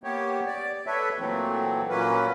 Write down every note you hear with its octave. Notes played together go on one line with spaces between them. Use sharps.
A#3 B3 G4 C#5
D5
A4 B4 C#5 E5
A#2 E3 F#3 A3 C4
A#2 F#3 A#3 C#4 B4